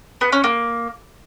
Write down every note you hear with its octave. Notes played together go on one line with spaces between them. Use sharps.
B3
C#4
A#3